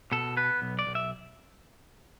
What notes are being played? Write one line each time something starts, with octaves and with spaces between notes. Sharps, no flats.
B2 A4
B3 B4
B1
D5
B1
E5